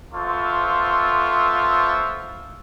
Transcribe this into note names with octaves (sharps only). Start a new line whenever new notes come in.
B3 F4 A4 C5 E5 C#6